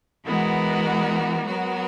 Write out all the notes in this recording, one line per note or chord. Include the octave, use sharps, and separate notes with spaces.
E3 G#3 B3 F#4 A#4
F#3 B3 F#4 A#4